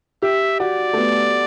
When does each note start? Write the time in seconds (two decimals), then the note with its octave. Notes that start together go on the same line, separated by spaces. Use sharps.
0.22 G4 E5
0.60 F#4 D5
0.93 A3
0.97 B3